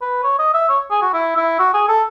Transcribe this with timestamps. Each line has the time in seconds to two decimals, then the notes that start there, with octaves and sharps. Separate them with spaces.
0.01 B4
0.23 C#5
0.39 D#5
0.54 E5
0.69 C#5
0.90 G#4
1.02 F#4
1.13 E4
1.36 E4
1.59 F#4
1.74 G#4
1.88 A4